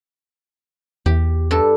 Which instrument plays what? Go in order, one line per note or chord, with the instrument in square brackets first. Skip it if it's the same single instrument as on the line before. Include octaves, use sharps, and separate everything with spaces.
[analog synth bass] E2 [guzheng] G4
[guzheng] G2 A4